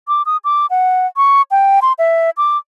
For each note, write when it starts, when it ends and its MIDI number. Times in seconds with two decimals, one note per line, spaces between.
0.08 0.22 86
0.26 0.37 87
0.44 0.66 86
0.70 1.07 78
1.17 1.42 85
1.51 1.80 79
1.82 1.93 84
1.99 2.30 76
2.37 2.57 86